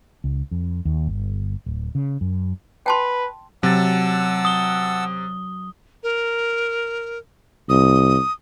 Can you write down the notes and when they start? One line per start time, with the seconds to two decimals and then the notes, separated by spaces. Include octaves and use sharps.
0.24 C#2
0.51 F2
0.85 D#2
1.07 G1
1.66 D1
1.95 C#3
2.21 F#2
2.86 B4 G5 A5 C6
3.63 C3 F#3 F#5 A5 E6 A6
4.45 D#6 G7
6.03 A#4
7.69 C2 D#6